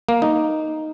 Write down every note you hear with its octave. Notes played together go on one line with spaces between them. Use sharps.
A#3
D#4